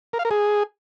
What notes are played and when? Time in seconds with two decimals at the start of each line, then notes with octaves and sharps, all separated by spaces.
0.13 A#4
0.19 F5
0.25 A#4
0.31 G#4